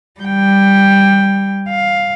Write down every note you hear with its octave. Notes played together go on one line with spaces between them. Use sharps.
G3 G5
F5